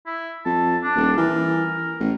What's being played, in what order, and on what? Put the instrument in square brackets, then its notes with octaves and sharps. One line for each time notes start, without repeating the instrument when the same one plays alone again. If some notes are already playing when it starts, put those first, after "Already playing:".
[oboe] E4
[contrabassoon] F2 [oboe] A5
[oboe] D4
[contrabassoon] D#1
[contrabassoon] E3 [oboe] A#4
[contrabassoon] A1